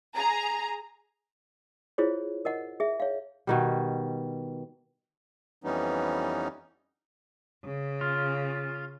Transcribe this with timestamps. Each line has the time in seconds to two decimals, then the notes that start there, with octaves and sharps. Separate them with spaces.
0.16 G#4 A#5
1.98 E4 F4 G#4 C5 C#5
2.45 A#4 D#5 F#5
2.80 G#4 E5
3.00 C#5 F5
3.47 B2 D#3 G3
5.64 F2 E3 G3 B3 C#4 D#4
7.64 C#3
8.01 F4